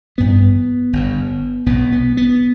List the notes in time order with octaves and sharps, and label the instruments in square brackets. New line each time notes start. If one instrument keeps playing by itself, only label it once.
[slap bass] A1 G2 B3
G1 G2
B1 B2 B3
B3
B3